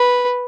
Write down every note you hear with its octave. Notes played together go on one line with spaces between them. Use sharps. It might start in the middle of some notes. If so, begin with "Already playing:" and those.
Already playing: B4